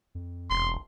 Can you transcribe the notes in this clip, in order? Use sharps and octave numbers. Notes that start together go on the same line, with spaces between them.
F2
E1 C6